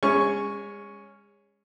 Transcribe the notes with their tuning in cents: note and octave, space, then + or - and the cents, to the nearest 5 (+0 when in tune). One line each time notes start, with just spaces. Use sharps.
G#3 -35 C#4 +0 C#6 +0